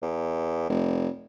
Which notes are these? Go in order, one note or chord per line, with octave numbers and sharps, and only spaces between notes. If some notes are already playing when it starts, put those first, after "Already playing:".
E2
F1